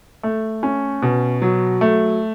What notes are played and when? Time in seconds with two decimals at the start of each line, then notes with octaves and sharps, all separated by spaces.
0.23 A3
0.63 C#4
1.02 B2
1.42 F#3
1.81 A3